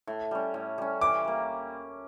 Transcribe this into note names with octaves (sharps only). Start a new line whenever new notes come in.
A2
G3 C#4
A2
G3 C#4
E3 D6
G3 A#3